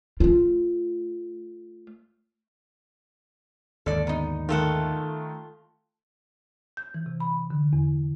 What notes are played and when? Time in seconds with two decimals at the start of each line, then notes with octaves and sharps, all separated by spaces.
0.20 A3 F4
3.86 D#2 G#2 D3 A4 D5
4.07 B3 D#4
4.49 D#3 A3 F4 A4 F#5
6.77 G6
6.94 E3
7.06 C3
7.20 B5
7.50 D3
7.73 E2